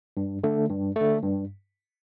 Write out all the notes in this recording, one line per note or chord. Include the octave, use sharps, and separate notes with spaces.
G2
D3 A3
G2
D3 A3
G2